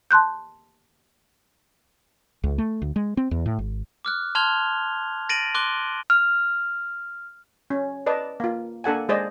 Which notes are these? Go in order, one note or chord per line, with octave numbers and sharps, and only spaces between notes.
A5 C6 F#6 G6
C#2
A3
D2
G#3
C4
E2
A2
G#1
D6 F6 F#6
A5 C6 F6 G#6 F7 G7
A6 A#6 D7 D#7 F#7
C6 D6 F#6 G7
F6
C#4
B4 D5 D#5 A5
A#3 F4
A#3 D4 A4 F#5 G#5
G#3 G#4 C5 D5 D#5